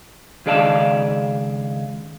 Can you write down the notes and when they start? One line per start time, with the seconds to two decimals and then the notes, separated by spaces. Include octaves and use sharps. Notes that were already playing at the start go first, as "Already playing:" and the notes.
0.46 C#2 D#3 G#4 D5 F5 A5